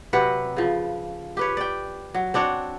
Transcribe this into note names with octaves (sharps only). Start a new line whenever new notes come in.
C3 F#3 B4 F#5
C#3 F3
G4 B4 C#5
D5 G5
F#3
C4 D4 F#4 C#5